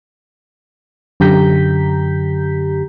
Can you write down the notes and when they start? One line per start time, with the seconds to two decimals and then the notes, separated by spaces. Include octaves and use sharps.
1.20 F#2 D3 G4 A#5 G6 B6